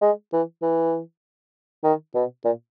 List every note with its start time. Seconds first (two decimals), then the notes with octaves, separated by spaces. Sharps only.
0.01 G#3
0.33 E3
0.62 E3
1.84 D#3
2.15 B2
2.45 A#2